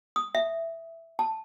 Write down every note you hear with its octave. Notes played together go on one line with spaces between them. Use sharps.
D#6
E5
A5